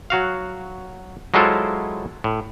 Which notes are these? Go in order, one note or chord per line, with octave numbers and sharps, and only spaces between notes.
F#3 F#4 F5
F#3 G#3 E4 F4 A4 C5
A2